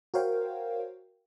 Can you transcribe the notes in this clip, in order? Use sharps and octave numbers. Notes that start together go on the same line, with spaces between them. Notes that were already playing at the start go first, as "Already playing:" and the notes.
F#4 A#4 C5 C#5 F5 G5